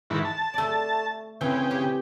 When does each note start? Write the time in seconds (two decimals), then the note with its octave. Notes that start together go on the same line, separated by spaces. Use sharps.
0.10 G#2 D#3 E3
0.25 A5
0.54 A3 D5
1.41 C#3 E3 C4 G5
1.71 G4